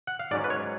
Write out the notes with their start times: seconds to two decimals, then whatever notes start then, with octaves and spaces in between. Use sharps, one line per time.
0.07 F#5
0.19 F5
0.31 G#2 F#3 C#4 D5
0.44 B4
0.50 C#5